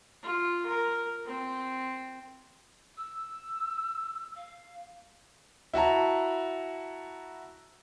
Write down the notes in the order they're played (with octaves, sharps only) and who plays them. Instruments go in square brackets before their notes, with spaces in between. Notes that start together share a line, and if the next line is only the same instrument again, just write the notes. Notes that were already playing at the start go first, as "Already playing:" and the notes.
[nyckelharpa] F4
A#4
C4
[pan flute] E6
F5
[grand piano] E4 F#4 A5 A#5